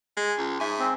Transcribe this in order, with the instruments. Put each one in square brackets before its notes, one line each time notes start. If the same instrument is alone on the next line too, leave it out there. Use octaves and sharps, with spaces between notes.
[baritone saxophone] G#3
C#2
[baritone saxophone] G#2 [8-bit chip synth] E5 G#5
[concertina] C4